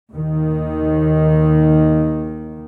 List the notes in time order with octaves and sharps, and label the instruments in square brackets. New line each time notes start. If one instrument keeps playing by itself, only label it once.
[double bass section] D#2 D#3